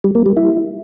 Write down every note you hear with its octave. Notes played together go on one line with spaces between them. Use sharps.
G3
A#3
G3
E4